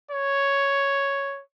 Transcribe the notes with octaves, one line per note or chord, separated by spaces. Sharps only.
C#5